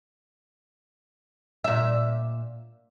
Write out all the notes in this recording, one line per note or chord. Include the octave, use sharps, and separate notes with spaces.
A#2 E5